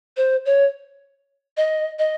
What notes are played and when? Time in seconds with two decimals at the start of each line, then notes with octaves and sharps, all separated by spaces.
0.17 C5
0.46 C#5
1.57 D#5
1.99 D#5